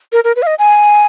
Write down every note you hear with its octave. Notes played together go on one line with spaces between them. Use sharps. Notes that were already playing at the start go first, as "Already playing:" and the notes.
A#4
A#4
B4
F5
D#5
G#5